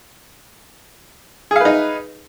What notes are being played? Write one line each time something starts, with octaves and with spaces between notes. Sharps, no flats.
D#4 G#4 B4 F5